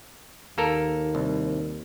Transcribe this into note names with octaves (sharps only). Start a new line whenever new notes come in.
D#2 A#3 A4 A#4
C2